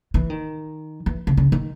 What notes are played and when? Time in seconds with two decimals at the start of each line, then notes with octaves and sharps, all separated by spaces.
0.14 E3
0.30 D#3
1.06 E3
1.27 C#3
1.37 C#3
1.52 D#3